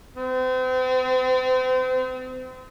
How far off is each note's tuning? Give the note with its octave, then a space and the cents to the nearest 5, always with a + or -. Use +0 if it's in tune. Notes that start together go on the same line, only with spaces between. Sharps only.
C4 -35